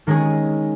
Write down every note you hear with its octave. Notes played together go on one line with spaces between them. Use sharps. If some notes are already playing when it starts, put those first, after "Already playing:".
D#3 G#3 C#4 G#4